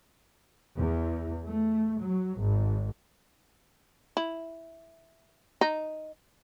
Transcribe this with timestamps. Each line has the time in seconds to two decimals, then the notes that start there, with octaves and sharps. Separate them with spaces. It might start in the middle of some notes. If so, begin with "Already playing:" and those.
0.77 E2
1.46 A3
2.00 F#3
2.38 G#1
4.17 E4
5.61 D#4